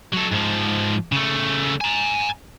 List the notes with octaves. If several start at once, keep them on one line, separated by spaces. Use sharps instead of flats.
F#3 A4
G#2 F3
C#3 A3
G#5 A#5